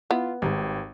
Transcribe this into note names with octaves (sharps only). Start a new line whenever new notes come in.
B3 E4 F4
G#1 G#2 D#3 G3 G4